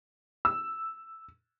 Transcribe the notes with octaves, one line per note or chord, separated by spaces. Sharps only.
E6